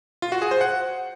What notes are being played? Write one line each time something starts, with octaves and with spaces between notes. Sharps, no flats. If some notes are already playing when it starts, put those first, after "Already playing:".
F4
F#4
G#4
C5
F#5